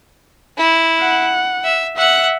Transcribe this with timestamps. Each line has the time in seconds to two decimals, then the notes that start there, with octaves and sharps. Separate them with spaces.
0.57 E4
1.01 F#5
1.64 E5
1.97 E5 F#5